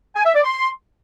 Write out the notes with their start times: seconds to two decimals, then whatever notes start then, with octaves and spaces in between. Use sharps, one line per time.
0.16 G#5
0.25 E5
0.35 D5
0.44 C6